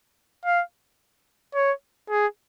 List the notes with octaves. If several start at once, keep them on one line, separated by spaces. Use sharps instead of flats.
F5
C#5
G#4